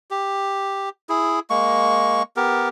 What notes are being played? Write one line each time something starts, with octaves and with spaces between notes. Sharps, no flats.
G4
E4 G#4
G#3 A#3 C#6
B3 G4 A#4